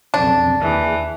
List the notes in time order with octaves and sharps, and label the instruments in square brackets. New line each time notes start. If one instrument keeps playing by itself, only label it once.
[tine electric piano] B1 F2 C#3 [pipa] D4
[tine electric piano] D#2 G#4 [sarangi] E3